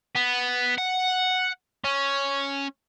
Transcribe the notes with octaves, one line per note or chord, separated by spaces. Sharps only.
B3
F#5
C#4